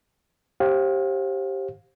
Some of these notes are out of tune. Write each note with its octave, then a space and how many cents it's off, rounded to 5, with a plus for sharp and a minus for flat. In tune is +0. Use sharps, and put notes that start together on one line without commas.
G4 -5 C5 +30 F5 +25